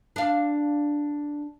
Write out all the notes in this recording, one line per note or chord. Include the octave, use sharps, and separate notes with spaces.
D4 F5